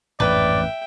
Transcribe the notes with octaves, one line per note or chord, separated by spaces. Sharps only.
A1 F2 G#2 B4 D5 E5 G5